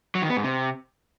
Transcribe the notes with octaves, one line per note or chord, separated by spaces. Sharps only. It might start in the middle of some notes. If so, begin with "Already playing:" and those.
F#3
D#3
B3
G#2
C3